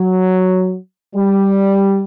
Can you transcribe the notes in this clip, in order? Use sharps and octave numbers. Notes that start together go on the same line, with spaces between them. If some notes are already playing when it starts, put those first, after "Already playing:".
Already playing: F#3
G3